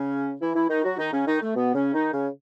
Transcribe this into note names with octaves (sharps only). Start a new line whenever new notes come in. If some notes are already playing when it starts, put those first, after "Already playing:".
Already playing: C#3 C#4
E3 E4
E3 E4
D#3 D#4
F#3 F#4
D#3 D#4
C#3 C#4
D#3 D#4
A3
B2 B3
C#3 C#4
D#3 D#4
C#3 C#4